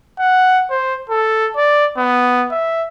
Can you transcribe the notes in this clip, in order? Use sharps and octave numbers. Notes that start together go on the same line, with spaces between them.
F#5
C5
A4
D5
B3
E5